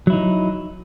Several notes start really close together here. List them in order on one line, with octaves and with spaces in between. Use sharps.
F#3 E4 D#4